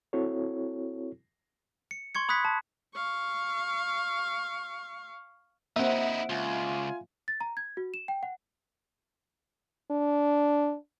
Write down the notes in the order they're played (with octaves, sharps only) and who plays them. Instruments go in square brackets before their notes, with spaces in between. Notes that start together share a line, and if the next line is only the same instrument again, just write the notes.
[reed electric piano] C4 E4 F#4 A4 C#5
[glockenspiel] C#7
C6 C#6 G#6 C#7
B5 D#6 F#6 G#6 B6 C#7
A5
[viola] F5 C#6
[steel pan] A#3 C4 [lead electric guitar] D#4 E4 [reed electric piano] E5 F#5
[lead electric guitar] C#2 [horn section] F4 G#5
[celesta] A6
A#5
G#6
F#4
E7
G5
F#5
[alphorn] D4